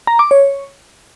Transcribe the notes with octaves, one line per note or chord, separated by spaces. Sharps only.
A#5
D6
C#5